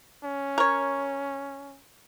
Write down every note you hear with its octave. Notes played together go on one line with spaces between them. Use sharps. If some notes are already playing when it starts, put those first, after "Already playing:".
C#4
A#4 C#5